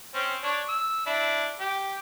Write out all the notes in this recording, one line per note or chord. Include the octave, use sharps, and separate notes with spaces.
C4 C#4
D4 C#5
E6
D4 E4
G4